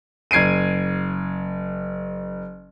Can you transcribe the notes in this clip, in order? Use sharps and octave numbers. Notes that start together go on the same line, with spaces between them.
F#1 G#6 C7 D7 D#7